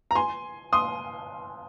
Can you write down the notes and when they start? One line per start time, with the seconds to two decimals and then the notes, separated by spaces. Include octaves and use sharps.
0.11 A#5
0.15 G#5 C6
0.73 C6 D#6